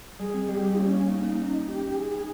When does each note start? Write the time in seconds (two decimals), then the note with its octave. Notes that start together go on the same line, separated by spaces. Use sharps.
0.20 G3 G#4
0.34 C4
0.48 G3 G4
0.63 G3
0.78 A#3 C#4
0.94 A#3
1.08 A#3 D#4
1.23 A#3
1.38 C#4
1.53 D#5
1.68 C#4 G4
1.82 C#4
1.97 D#4 G#4
2.12 D#4